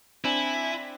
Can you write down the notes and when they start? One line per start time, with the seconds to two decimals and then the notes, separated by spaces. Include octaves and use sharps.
0.25 C4 D4 E4 G#5